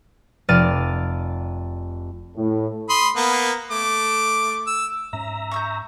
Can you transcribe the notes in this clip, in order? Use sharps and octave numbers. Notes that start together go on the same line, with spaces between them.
F1 D5 F6 A6 D#7
A2
B5 C6 D#6
A#3 B3
A3 D6
E6
G#2 C#4 E5 A#5
C#6 E6 G6